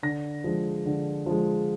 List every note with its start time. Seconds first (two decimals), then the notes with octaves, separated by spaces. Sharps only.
0.03 D3 A#6
0.44 F3 G#3
0.86 D3
1.26 F3 G#3